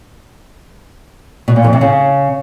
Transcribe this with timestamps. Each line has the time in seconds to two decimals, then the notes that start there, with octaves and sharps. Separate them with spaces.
1.48 B2
1.56 A#2
1.64 F2
1.73 C3
1.81 C#3